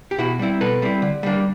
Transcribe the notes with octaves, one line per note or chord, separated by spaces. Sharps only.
G4
B2 E4 F#4
G3 C4 E4
B2 A4 B4
G3 C4 E4
D3
G3 A#3 D4